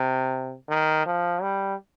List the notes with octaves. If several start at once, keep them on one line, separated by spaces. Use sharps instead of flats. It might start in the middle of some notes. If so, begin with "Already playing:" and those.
Already playing: C3
D#3
F3
G3